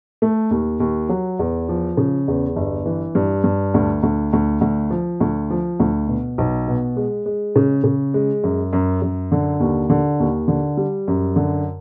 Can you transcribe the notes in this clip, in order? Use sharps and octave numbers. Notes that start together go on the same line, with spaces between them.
A3
D#2
D#2
F#3
E2
F3
C#3
E2
G1
E3
G2
G2
D2
D2
D2
D2
F3
D2
F3
D2
B2
B1
B2
G#3
G#3
C#3
C#3
G#3
F#2
F#2
F#2
D3
D#2
D3
D#2
D3
G3
F#2
D3